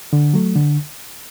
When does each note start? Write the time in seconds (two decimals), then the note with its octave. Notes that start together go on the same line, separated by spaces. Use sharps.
0.13 D3
0.34 F#3 A3
0.55 D3